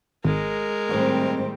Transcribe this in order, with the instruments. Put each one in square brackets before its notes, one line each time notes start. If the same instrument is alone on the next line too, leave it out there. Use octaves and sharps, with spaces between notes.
[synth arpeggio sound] G#1 [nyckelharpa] G#3 A#4
[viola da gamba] A2 D#3 G3 [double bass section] C4